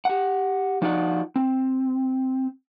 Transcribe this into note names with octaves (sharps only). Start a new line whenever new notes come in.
G4 F#5
F3 D#4 F4 F#4 D5 F#5
C4